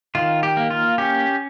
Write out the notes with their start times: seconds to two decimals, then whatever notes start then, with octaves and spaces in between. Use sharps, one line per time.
0.15 D#3 F4
0.43 G4
0.57 A#3
0.70 F4
0.98 C#4 G4